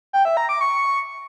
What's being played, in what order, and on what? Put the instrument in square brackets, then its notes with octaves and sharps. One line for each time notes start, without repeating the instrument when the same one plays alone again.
[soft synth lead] G5
E5
A#5
D6
C#6